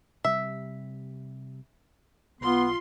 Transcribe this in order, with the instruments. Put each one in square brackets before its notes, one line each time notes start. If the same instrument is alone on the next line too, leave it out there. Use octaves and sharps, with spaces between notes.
[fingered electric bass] C3 G3 [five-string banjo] E5
[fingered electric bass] B1 [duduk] B3 [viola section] F4 C6